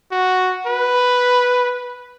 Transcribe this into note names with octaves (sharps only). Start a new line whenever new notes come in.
F#4
B4